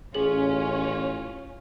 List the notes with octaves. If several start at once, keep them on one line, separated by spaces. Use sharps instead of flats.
A1 C#4 F4 G#4 F#7